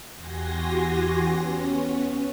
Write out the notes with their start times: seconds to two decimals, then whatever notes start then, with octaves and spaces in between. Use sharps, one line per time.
0.14 E2 F#4 G4 G#5 C6 A#6
1.21 B3 C#4